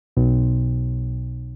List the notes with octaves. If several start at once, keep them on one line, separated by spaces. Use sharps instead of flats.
B1